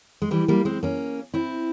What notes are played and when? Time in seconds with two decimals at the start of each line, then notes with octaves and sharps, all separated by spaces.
0.22 G#3
0.31 E3 G3
0.48 G3 A#3
0.65 G#3 C4
0.83 A#3 C#4
1.34 C4 E4